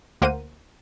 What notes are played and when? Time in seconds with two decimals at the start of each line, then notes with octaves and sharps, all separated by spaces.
0.22 D2 A#3 A#4 C5 F#5 D#7